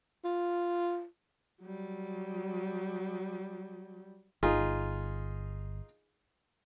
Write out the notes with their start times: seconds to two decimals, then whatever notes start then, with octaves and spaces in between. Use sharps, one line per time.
0.24 F4
1.61 F#3 G3
4.43 G1 D#4 F4 G#4